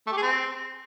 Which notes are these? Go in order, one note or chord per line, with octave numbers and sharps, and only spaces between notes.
A3
G4
G#4
C4